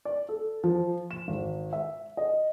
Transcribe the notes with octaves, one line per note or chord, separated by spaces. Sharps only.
D5
A4
F3
E7
G#1
E5
D#5